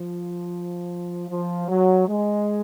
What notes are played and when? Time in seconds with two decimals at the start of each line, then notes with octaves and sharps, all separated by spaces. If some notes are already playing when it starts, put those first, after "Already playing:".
Already playing: F3
1.29 F3
1.69 F#3
2.07 G#3